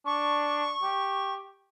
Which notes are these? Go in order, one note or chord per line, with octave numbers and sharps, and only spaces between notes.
D4 C#6
G4